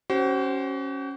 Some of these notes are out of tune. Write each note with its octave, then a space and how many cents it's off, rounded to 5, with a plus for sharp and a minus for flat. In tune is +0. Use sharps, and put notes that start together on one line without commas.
C#4 -5 F#4 +40 C5 +0